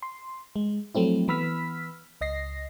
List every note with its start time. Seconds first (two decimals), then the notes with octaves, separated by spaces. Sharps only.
0.02 C6
0.56 G#3
0.95 F3 F#3 A3 C4 E4
1.28 E3 B3 B5 E6 F6 B6
2.21 C#2 D#5 A#6 C7